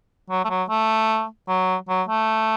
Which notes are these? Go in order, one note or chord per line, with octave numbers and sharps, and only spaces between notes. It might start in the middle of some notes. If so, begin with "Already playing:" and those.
F#3
A3
F#3
A3
F#3
F#3
A3